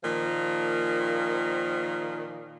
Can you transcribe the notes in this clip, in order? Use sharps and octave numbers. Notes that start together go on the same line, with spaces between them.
A#2 D#3 F3